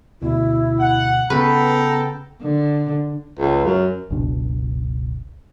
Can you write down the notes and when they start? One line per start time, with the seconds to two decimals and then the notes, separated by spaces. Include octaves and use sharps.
0.22 D2 B2 E4
0.79 F#5
1.30 C#3 B3 A4 B4 F#5 G5 A#5
2.41 D3
3.40 C#2
3.65 F#2
4.10 F#1 C#2 B2 D4